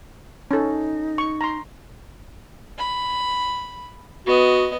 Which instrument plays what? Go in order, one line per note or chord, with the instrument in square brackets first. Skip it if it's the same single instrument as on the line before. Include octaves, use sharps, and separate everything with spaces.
[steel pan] C#4 A4 [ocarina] D#4
[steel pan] C#6
A#5 C6
[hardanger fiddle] B5
[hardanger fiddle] B3 D#5 [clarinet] F#4